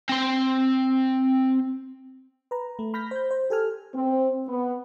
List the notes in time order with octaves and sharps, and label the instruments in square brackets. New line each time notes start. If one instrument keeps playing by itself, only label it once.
[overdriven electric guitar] C4 C6
[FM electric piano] B4 A#5
A3
B5 F6 G6 A#6 B6
C5 G6
C5
G4 A4 G#5 F6
[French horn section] C4
B3